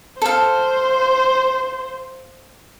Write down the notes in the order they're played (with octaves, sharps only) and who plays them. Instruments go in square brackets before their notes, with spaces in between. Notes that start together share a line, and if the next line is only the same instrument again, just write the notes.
[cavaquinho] A4 F5 [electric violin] C5